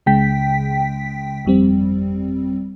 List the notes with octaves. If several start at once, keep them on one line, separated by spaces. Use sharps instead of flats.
C#2 C#3 G#3 G5 B6
G1 F2 G3 C4